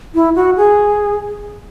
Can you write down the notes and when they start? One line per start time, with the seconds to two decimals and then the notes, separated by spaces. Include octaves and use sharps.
0.15 E4
0.36 F#4
0.57 G#4